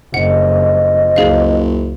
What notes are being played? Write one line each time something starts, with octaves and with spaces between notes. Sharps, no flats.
F#1 F2 C5 D#5 F#5
F#1 C#2 G#4 F5